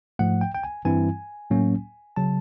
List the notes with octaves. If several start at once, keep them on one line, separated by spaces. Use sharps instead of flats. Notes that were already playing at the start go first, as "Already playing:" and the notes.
G#2 F3 A3 F#5
G5
G5
G#5
G2 E3 G3 C4 E4 G#5
A2 F#3 A#3 C#4
C#3 F#3 A5